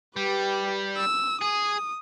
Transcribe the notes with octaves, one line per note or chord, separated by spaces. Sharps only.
G3 G4 B4
E6
G#4 D#6